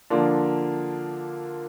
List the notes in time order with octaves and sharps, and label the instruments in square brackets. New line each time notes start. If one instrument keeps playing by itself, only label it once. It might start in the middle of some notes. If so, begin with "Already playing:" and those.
[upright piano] D3 F3 A#3 D4 F4